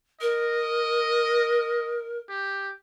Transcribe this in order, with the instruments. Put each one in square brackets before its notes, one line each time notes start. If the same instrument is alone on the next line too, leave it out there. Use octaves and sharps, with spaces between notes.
[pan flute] A#4 [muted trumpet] D#5
[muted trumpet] G4